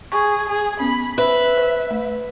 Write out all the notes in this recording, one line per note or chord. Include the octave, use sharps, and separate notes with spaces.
G#4 C#6
G#4
B3 C#4 B5
B4 C5 E5
C5
A3